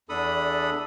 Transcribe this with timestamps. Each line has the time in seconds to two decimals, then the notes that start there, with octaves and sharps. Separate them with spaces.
0.09 E2 D4 A4 B5 D#6